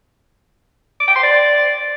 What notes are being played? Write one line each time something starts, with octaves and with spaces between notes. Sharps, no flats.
D6
G5
C6
D5